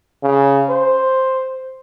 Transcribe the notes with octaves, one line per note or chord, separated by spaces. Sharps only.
C#3
C5